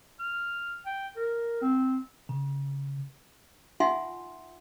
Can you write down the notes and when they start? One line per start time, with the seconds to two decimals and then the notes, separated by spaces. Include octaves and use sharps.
0.19 F6
0.86 G5
1.17 A#4
1.62 C4
2.29 C#3
3.80 D#4 F4 E5 F#5 G#5 C6